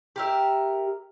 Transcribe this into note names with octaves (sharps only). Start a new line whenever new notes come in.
G4 A#4 E5